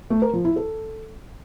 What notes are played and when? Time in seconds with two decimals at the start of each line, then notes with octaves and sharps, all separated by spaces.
0.10 A3
0.22 A#4
0.33 F3
0.45 E4
0.56 A4